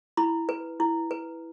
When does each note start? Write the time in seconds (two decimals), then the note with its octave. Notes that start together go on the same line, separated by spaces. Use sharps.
0.17 E4 B5
0.49 B4
0.80 E4
1.11 B4